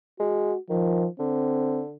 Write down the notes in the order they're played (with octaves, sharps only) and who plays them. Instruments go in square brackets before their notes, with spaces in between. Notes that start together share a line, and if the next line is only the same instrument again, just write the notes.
[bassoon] G#3 [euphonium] F#4
[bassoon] D#3 [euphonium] F3
[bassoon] D3 [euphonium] C4